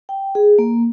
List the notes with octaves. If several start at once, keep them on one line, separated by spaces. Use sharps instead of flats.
G5
G#4
A#3